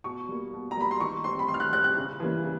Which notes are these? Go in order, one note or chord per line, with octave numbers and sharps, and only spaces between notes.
B2 C#6
G3 A#3
B2
A#5
G3 A#3 B5
C6
D#3 C#6
G3 C4 C6
B5
D#3 C6
F6
F#6
G3 C4 F#6
F#6
C#3
E3 G3 A#3 C#4
C#3